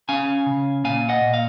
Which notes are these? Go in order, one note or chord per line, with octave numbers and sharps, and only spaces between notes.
C#4 F5 G#5
C#3
A#2 F5 G#5
D#5 F#5
A#2
F5